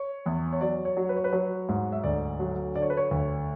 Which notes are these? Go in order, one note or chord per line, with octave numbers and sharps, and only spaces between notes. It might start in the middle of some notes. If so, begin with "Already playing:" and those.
Already playing: C#5
E2
C#5
F#3 D5
C#5
F#3
B4
C#5
B4
F#3 C#5
G#2
E5
D2 D5
F#3
D3 D5
C#5
B4
C#5
D2